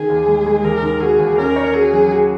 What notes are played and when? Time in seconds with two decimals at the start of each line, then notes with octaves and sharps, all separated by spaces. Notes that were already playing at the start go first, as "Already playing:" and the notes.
Already playing: D#3 G#4
0.10 D#2
0.28 G#3
0.46 G#3
0.64 D#2 A#4
0.83 D#3
1.01 F#4 G#4
1.19 D#2
1.38 C#4 A#4
1.56 C#5
1.74 F#4 G#4
1.93 F#3
2.12 F#4